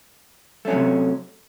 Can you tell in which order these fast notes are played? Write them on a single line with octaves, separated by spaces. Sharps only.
A3 C#4 F#3 C3